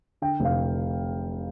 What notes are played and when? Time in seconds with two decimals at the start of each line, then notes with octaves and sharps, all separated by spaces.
0.22 D3 G5
0.40 F1 F5